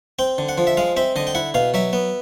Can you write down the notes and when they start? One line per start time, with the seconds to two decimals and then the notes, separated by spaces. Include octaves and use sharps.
0.19 C4 G5
0.38 D3
0.49 F#5
0.58 F3
0.67 E5
0.77 G#3 F5
0.97 C4 E5
1.16 D3 D#5
1.27 G5
1.35 E4 F#5
1.54 B2 F5
1.74 F#3 E5
1.93 B3